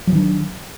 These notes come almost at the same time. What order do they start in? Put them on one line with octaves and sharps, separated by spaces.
F#3 F3 D#3 D4